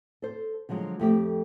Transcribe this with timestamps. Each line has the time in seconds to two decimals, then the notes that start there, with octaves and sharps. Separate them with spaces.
0.22 A4 C5
0.69 D3 F3 F#3 G#3
1.00 F2 A3 G4